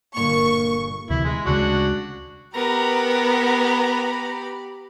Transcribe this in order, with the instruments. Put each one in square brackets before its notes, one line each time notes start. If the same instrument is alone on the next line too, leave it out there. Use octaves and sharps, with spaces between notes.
[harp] G1 A#2 B5 [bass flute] A#3 [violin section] C#6
[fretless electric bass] D2 C3 E3 [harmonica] E4
[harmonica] G#3
[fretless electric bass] D2 C#3 G#3 [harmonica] D4 F#4
[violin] B3 [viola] G4 B5 [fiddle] A#4 [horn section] A#5